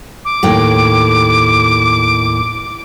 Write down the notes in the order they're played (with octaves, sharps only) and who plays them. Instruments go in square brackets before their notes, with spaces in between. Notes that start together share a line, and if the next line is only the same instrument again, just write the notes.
[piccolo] D6
[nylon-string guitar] D#2 A2 G5